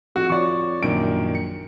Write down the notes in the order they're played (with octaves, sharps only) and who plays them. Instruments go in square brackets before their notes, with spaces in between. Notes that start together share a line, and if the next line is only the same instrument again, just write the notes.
[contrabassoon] F2 [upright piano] F#4
[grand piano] F3 C#5 [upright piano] D5 C#6
[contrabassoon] A#1 [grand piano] F#2 A#2 D#3 [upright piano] D7
[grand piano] C#7